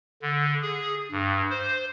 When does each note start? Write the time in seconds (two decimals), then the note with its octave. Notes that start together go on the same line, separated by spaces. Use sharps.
0.22 D3
0.62 G#4
1.12 G2
1.50 C5